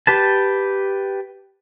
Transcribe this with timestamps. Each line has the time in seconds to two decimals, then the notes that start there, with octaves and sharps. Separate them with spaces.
0.07 G4 B4 A5